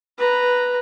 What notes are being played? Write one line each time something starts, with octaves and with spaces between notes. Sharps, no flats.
B4 A#5